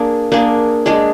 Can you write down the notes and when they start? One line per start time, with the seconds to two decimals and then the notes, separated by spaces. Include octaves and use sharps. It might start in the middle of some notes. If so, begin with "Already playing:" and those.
Already playing: A#3 D4 G#4
0.32 A#3 D4 G#4
0.86 G#3 D4 G#4